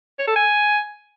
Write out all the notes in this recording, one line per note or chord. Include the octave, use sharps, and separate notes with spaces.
C#5
A4
G#5